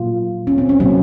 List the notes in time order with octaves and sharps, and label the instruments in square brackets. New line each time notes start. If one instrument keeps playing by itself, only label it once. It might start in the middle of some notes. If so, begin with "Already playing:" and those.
Already playing: [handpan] A#2 F#3 A#3 F4
C#4
C4
C#4
C3 F#3 A#3 C#4